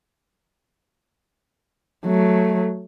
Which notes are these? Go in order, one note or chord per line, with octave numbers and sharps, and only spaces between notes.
F#3 A3